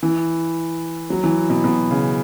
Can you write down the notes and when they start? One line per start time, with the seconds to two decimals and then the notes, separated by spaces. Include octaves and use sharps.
0.03 E3
1.10 F#3
1.24 E3
1.50 B2
1.64 B2
1.91 C#3